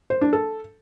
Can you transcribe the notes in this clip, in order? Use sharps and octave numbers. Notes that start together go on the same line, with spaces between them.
C5
D4
A4